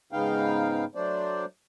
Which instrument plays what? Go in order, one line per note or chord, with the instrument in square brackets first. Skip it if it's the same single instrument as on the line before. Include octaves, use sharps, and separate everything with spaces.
[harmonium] G#2 C#3 B3 D#4 F5 G5
F#3 A3 D4 C5 D5